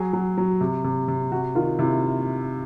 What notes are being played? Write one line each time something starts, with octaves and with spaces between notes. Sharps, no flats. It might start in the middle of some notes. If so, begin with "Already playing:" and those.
Already playing: F#3 G#4
F#3
F#3
C3
C3
C3
C3 F#4
D#3 F4
C3 E4